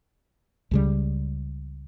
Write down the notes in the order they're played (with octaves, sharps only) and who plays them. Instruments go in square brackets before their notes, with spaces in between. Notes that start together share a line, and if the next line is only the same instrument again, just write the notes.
[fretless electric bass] C#2 C#3 G3